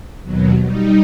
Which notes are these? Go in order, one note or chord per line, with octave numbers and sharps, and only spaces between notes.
D#2 B2 F#3
G3 D#4